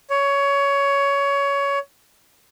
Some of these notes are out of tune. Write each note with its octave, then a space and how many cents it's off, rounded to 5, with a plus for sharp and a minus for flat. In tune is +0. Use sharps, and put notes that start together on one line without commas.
C#5 +20